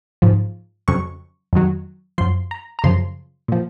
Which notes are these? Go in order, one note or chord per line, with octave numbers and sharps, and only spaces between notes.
G#2 F3
F2 C#3 F#3 C#6
F2 D#3 F#3
F#2 F3 C6
A#5
A#5
F#2 C#3 F3 C6
A#2 F3